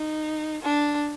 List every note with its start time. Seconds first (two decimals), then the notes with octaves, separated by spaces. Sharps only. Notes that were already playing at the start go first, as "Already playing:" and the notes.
Already playing: D#4
0.62 D4